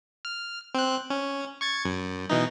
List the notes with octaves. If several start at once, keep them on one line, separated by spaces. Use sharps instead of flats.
F6
C4 F#6
C#4
C#6 G#6 A6
F#2
B2 E3 D#4